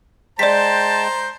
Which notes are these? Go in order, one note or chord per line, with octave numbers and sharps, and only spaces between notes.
G#3 C5 D5 G5 A5 A#5 B6